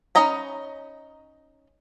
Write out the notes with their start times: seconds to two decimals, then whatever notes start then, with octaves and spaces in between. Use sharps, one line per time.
0.15 C#4 D#4 D#5 A#5 B5